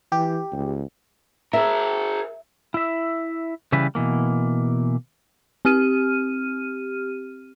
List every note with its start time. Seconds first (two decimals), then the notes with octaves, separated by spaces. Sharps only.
0.12 E3 G4
0.52 C#2
1.53 G#4 A#4 E5
2.74 E4 E5
3.72 C#3 E3 G3 B4
3.95 B2 E3 A#3
5.65 C4 G4 F6 D#7